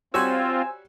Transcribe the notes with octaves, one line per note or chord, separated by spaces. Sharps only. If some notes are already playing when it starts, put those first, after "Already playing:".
G3 C4 F4 F#4 C5 C#5 G#5 E6